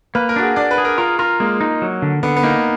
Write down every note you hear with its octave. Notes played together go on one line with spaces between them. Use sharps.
A#3 B4
A#4
D4 F#4
G#4
D4 D5
B4
G#4
A#4
F4 A#4
F4 A#4
G#3 A#3
D#4
F#3
D3
D3 B3
B3
A#3 D#4